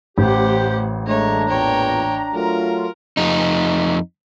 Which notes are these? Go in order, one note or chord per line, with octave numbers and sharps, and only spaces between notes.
A1 G4 C5 F#5
G#3 A3 D4 C#5 A#5
E2 A#2 C#5 G5
F#3 A3 F4 A#4
F2 D#4